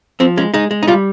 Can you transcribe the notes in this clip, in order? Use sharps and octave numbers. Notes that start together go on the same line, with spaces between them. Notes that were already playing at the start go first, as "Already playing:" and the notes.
F3 C4
G#3 C#4
G#3 D#4
G#3
D#4
G3 F4